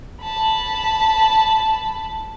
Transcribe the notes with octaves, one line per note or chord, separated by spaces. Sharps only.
A5 B5